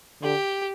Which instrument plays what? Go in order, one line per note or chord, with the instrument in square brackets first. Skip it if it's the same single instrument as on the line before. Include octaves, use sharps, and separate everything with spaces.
[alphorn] D3 [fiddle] G4